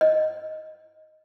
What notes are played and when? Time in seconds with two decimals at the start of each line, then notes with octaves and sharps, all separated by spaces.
0.01 D#5